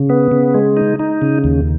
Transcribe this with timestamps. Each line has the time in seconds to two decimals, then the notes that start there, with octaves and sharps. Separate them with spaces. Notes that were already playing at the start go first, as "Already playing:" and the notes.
Already playing: C#3
0.10 B3
0.32 C#3
0.54 G#3
0.77 D#4
0.99 D#4
1.22 C#3
1.44 D#2